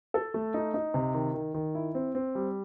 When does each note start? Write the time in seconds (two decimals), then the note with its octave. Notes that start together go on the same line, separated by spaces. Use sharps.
0.14 A4
0.34 A3
0.54 D#4
0.74 D#4
0.94 C3
1.14 D#3
1.34 D#3
1.54 D#3
1.75 E4
1.95 C4
2.15 C4
2.35 G3